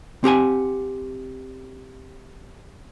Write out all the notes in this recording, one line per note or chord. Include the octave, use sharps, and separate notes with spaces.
C4 G4 F#5 G#5